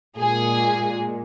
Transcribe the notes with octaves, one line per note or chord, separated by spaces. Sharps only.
A#2 G#3 G#4